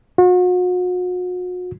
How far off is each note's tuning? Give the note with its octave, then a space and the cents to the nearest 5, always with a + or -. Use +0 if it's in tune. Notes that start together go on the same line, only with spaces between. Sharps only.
F#4 -40